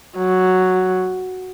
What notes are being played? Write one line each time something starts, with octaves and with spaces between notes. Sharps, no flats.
F#3